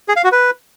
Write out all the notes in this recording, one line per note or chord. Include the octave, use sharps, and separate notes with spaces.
G#4
F5
F#4
B4